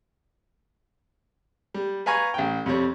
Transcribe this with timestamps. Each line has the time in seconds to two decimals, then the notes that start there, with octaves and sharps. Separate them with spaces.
1.74 G3
2.06 B4 F5 G#5 A#5 C#6
2.34 A1 G5
2.66 F2 C3 G3 C#5